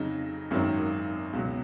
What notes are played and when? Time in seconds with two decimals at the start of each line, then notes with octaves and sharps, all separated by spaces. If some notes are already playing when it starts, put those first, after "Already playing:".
Already playing: F2 C#3 F#3 D#4
0.50 G#1 F#2 D#3 F#3
1.33 C#2 B2 F#3